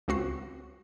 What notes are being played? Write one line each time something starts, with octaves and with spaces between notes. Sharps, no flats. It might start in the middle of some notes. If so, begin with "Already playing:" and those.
C#2 C4 F#4 C7